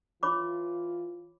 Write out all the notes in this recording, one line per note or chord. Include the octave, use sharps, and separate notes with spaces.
E3 F4 C#5 B5 D6